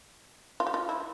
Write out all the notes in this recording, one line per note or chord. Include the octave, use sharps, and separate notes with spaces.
F4
G4
F4
E4